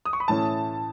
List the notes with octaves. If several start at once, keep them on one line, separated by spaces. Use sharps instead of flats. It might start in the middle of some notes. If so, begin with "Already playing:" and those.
D#6
C#6
B5
A2 E3 A3 C#4 A5